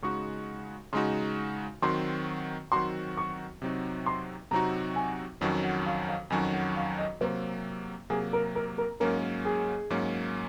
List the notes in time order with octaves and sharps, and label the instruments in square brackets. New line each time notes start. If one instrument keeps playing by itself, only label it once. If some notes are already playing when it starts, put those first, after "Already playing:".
[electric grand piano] C#3 G#3 D#4 F#4 [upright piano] C#6
[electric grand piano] C#3 G#3 D#4 F#4 [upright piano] C6
[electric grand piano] D#3 F#3 C4 F#4 [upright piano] C6
[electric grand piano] D#3 F#3 C4 F#4 [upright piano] C6
[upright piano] C#6
[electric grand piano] C3 F#3 C4 D#4 F#4
[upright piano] C6
[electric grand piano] C3 F#3 C4 D#4 F#4 [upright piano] A#5
[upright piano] G#5
[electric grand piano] F2 D#3 F#3 C#4 F#4 [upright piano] C#5
[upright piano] F#5
F5
F5
[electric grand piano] F2 D#3 F#3 C#4 F#4 [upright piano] G#5
[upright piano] F#5
F5
D#5
[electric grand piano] C3 F#3 A#3 [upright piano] C5
[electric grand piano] C3 F#3 A#3 [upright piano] G#4
[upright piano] A#4
A#4
A#4
[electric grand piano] G#2 F#3 A#3 C#4 [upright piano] A#4
[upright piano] G#4
[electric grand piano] G#2 F#3 A#3 C#4